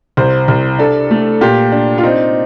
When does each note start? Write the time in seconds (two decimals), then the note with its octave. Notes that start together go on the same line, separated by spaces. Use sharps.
0.17 C2 C5
0.48 C2
0.79 D4 A4
1.11 A3
1.41 A#2 G4
1.72 D4
1.98 F4
2.03 C4 D#4